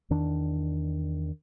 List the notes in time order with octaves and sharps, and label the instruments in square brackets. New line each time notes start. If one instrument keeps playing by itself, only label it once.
[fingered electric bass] E2 D#3 D4